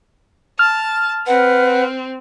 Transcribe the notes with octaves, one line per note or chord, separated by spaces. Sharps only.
A5 F6
C4 B4 F#5